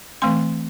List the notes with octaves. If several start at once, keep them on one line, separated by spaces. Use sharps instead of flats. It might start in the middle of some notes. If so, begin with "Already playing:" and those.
E3 A3 C4 C6